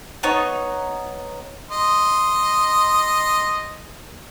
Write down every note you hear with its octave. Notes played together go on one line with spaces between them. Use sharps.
B3 D#4 C#5
D#5 C6